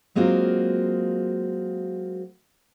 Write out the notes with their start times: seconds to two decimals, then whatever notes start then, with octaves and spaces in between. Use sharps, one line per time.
0.15 F#3 G#3 A#3 C4 F4 F#4